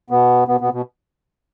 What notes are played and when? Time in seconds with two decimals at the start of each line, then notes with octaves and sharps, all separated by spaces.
0.10 B2 B3
0.48 B2 B3
0.60 B2 B3
0.73 B2